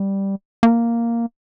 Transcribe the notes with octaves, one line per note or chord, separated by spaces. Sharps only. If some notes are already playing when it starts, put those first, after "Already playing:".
Already playing: G3
A#3